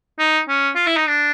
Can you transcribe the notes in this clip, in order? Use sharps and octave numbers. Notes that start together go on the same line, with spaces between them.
D#4
C#4
F4
E4
D#4
D4